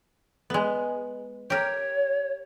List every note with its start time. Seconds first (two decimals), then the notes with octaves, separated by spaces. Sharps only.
0.50 G#3 B3
1.50 G4 A#4 C#5